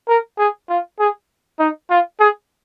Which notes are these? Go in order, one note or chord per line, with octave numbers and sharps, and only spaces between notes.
A#4
G#4
F4
G#4
D#4
F4
G#4